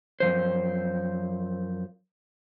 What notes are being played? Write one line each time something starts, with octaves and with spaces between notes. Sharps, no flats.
F#2 F3 C5